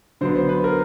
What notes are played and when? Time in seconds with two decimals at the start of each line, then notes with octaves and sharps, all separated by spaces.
0.21 D3 F#3 B3 C5
0.36 C5
0.49 B4
0.64 A#4